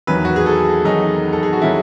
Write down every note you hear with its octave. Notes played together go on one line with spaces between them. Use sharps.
E2 D#3 F#3 B4
F#4
G#4
A4
E2 D#3 F#3 D#4
A4
G#4
F#4
D#3 F#3 E4